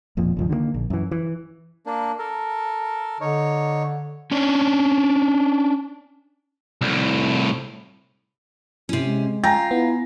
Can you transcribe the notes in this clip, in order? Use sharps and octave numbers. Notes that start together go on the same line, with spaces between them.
E1 F2 A#2 F3
G1 C#2 F3
D3 D#3 F#3 A#3
A#1
F#2 E3
E3
A#3 D4
A4 A#4
D3 D#4 C#5
C#4 D4 C#5
C2 A2
C3 C#4 E4
G#3
F4 G5 G#5 A#5 A#6
B3 E4